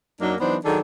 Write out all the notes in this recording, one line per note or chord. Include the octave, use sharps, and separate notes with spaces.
F#2 F#3 A#3 D4 D#4
E3 F#3 B3 D4 D#4 C5
D#3 F#3 D4 D#4 G#4 A4